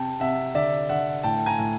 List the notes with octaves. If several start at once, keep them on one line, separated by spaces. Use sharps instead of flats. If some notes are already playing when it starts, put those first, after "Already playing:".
Already playing: C3 G5 A5
C3 E5 F#5
D3 D5 E5
D3 E5 F#5
A2 G5 A5
G#5 A#5
A2